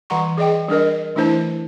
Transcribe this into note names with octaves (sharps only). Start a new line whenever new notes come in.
E3 G3 F#5 A#5 C#6
G#4 D5 D#5 G5
G3 D4 A#4 D#5
E3 A3 D4 E4 C5 A5